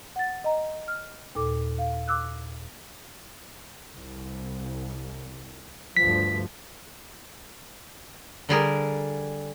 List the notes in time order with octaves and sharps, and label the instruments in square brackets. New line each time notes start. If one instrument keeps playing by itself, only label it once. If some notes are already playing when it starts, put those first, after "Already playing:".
[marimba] F#5 A6
D#5 A#5
F6
D#2 A#2 A4 D6
F5
D6 E6 F#6
[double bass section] C2
[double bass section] D2 G2 F3 [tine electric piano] B6
[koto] D3 G3 G#4 A#4